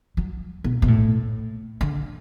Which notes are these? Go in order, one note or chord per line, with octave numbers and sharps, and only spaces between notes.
F#3
B2
B2
A2
D3